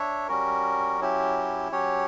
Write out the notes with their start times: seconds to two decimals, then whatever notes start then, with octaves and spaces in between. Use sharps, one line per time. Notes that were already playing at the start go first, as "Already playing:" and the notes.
Already playing: D4 C#5 E5
0.28 G3 C#4 F#4 A#4
1.00 F#3 C#4 E4 G4
1.72 F#3 C#4 G4 C#5